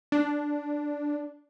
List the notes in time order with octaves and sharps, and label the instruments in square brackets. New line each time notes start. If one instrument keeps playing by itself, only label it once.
[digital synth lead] D4